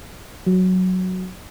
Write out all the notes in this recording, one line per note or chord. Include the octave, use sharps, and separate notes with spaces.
F#3